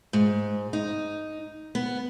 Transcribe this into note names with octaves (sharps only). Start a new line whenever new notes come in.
G#2
D#4
B3